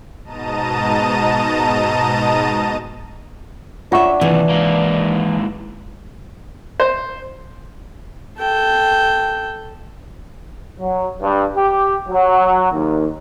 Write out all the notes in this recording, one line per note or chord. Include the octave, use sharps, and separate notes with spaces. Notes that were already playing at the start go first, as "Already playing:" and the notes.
G#2 B2 D#5 A5 A#5 D#7
D4 F4 C#5 E5 F#5 C#6
D#2 C3 E3
G#2 A#3
C5
A4 G5
F#3
G2
G4
F#3
D#2